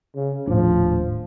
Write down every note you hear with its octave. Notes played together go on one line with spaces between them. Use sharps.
C#3
D#1 A2 F3 D4